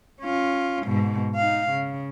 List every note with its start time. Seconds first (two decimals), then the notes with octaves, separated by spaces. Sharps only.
0.21 C#4 F4
0.86 G#2 B2
1.36 D#4 F5
1.70 C#3